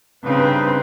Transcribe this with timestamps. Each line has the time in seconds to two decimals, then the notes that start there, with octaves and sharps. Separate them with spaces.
0.24 G2 C#3 C4 D#4 B4